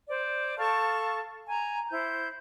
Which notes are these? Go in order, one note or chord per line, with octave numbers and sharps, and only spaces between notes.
C5 D5
A4 F5 A5 C#6
G#5 A#5
E4 C5 G6